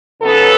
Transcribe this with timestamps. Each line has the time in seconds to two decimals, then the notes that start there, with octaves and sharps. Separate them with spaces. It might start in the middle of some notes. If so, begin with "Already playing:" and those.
0.21 C#3 F#3 B3 D#4 A4